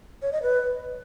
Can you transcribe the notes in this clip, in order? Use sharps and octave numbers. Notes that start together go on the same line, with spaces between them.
C#5
D#5
B4